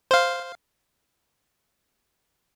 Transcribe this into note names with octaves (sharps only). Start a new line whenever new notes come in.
C5 F5